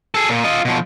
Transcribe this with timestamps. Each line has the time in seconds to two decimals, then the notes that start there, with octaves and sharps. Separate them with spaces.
0.14 G#4 A4
0.29 A#2
0.44 F4 D#5
0.65 B2 F3